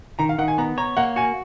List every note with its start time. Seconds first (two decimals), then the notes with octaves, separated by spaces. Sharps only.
0.19 D#3 A#5
0.29 F5
0.38 D#3 F#5
0.48 G#5
0.58 B3 A#5
0.78 C#5 A#5
0.97 A#3 F#5
1.16 F#4 G#5